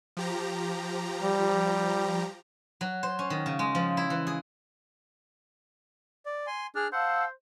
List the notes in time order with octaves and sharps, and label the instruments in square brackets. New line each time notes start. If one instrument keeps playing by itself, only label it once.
[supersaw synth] F3 G4 A#5
[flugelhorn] G3
[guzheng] F#3
C5
C#4
D#3
C#3
G#3
F3
E4
E3
G#4
[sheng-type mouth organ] D5
G#5 C6
[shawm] D4 [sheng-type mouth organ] G#4 F6
[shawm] C5 [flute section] F5 A5 E6 [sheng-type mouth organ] F#5